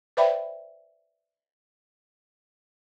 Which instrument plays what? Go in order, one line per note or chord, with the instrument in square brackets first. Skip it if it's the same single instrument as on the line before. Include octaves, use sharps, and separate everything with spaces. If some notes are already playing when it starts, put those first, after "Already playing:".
[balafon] B4 C5 D5 E5 G5 B5